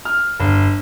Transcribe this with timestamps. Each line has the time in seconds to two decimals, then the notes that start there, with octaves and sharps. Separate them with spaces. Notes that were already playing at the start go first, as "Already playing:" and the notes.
0.05 F6
0.40 G1